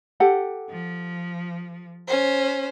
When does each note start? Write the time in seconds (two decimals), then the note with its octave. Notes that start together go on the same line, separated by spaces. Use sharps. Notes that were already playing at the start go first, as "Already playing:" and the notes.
0.20 G4 A4 F#5
0.70 F3
2.07 C#4 C5